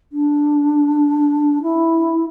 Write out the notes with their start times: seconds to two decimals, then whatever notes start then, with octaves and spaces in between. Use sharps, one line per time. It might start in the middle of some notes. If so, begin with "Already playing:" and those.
0.12 D4
1.62 E4